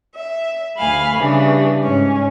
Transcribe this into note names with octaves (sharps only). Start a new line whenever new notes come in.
E5
D2 F5 G#5 B5
C#3 E3 G3 D4
G#2 C#4